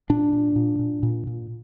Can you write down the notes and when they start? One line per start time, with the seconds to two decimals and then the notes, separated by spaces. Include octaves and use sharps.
0.09 A#2 D4
0.33 A#2
0.56 A#2
0.79 A#2
1.03 A#2
1.27 A#2